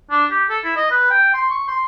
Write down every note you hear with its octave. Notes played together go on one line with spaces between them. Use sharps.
D4
G4
A4
E4
D#5
B4
G5
C6
C#6
C6